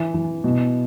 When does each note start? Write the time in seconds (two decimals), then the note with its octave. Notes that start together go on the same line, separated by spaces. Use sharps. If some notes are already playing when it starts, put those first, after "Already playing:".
Already playing: E3
0.14 E3
0.44 B2